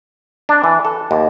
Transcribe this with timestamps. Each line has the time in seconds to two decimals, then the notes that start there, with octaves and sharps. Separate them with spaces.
0.49 D4
0.64 E3
0.85 A4
1.11 D#2